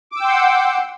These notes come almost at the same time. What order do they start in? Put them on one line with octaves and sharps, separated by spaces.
D6 E6 G5 C6 F#5